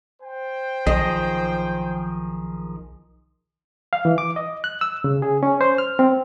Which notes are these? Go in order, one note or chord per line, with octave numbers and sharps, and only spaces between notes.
C5 G5
B1 D#3 F3 G#4 D#5
F5
E3
D6
D#5
F#6
E6
C#3
G#4
C#4
C5
F6
C4